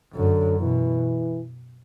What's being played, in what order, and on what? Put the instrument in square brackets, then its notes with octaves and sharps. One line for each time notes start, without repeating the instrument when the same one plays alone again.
[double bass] F#2 [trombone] D3
[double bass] B2 [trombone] E3